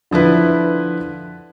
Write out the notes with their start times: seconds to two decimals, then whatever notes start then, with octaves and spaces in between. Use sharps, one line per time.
0.11 D3 F3 E4 B4